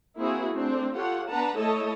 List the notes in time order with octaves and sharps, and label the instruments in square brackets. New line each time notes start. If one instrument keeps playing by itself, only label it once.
[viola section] A#3 C4 E4 F#4 G#4
A3 C4 D4
F4 G4 A4 C#5 F#5
B3 D4 B4 F#5 A5 A#5
A3 E4 A4 C#5 D#5 A5